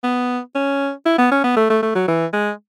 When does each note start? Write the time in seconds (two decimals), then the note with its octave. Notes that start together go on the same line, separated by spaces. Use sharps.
0.04 B3
0.55 C#4
1.06 E4
1.18 B3
1.31 C#4
1.44 B3
1.56 A3
1.70 A3
1.83 A3
1.95 F#3
2.08 E3
2.33 G#3